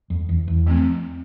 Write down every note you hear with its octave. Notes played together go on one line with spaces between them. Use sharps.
F2
E2
E2
F3 A3 C4